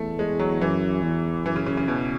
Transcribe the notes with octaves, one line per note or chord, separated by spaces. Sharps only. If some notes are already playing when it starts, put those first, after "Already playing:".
Already playing: E2 A3
G#3
F#3
F#2 E3
E2
F#2 E3
C#3
C#3
C#3
E2 B2